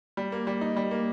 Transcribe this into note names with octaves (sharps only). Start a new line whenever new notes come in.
G3
A#3
G3
D#4
G3
A#3